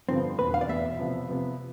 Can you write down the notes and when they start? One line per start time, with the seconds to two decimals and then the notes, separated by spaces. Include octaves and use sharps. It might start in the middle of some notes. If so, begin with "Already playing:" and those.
0.09 G2 D3 F3 B3 C4
0.39 E2 B2 B3 B4
0.54 F5
0.61 D5
0.68 E2 B2 B3 E5
0.99 C3 F3 B3
1.28 C3 F3 B3